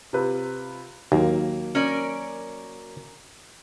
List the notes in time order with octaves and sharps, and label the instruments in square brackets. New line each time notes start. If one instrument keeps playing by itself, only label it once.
[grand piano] C3 F4 B4
[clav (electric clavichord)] D#2 [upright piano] F#3 A#3
[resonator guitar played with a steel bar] C#4 A#4 D5